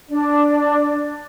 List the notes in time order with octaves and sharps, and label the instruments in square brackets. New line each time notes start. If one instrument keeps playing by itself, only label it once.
[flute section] D4 D5